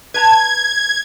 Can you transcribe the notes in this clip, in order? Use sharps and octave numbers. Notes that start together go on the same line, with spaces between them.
B4 A5 A#5 G#6